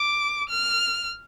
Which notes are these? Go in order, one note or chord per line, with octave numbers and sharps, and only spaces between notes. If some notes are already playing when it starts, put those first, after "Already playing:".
Already playing: D6
F6